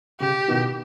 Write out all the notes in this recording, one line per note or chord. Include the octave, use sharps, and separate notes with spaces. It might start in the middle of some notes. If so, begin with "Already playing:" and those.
C#3 G4
B2 D#3